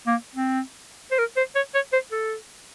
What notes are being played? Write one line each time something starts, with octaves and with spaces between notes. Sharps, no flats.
A#3
C4
C5
A#4
C5
C#5
C#5
C5
A4